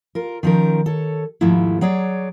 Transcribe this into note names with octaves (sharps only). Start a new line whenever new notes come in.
F4 A#4
D#3 F3 C#4 A#4
A4 C#5
D#2 G#2 F3 A3 E4
F#3 G#4 C#5 D5